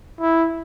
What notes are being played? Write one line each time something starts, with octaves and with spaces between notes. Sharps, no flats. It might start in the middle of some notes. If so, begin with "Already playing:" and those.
E4